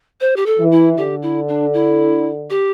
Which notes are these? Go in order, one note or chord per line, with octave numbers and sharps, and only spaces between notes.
C5
G4
A4
E3
E4
D3 G4
E4
D4
E4
G4